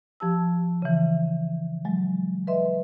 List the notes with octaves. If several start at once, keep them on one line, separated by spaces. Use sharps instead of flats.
F3 G4 A5 E6
C#3 E3
F#3 G#3
B4 D#5 E5 C6